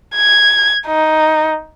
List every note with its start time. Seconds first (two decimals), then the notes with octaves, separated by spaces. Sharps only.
0.16 G#6
0.87 D#4